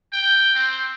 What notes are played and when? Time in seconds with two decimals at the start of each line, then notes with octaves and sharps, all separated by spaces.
0.13 G5
0.55 C4